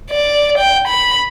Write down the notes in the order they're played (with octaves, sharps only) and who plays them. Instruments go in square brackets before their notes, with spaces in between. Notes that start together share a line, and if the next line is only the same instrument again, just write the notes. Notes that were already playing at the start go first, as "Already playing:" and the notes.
[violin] D5
G5
B5